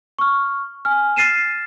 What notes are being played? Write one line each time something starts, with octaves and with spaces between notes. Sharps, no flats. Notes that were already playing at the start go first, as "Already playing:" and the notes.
C#6 F6
G#5 F6
F6 A6 C7 D#7 E7